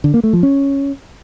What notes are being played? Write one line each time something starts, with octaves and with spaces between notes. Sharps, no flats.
D3
A#3
A3
F3
C#4